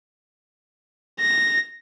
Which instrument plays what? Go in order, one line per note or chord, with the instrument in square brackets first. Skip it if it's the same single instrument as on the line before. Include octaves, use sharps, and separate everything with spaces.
[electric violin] A#6